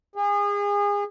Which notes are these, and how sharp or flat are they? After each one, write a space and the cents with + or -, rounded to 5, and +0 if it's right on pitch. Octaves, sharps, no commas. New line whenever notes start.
G#4 -30